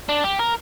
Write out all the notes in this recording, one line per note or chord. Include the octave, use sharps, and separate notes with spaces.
D4
G4
A#4